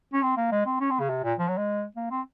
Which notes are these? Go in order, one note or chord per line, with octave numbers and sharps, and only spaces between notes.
C#4
C4
A#3
G#3
C4
C#4
C4
C#3
C3
A#2
F3
F#3
G#3
A#3
C4